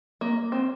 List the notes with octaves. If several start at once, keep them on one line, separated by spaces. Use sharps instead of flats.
A#3
C4